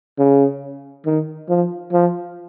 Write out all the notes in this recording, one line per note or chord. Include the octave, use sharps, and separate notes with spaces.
C#3
D#3
F3
F3